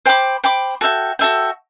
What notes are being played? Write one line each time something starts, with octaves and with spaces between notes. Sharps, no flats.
C5 G5 B5 D6
C5 G5 B5 D6
F#4 A4 E5 G5
F#4 A4 E5 G5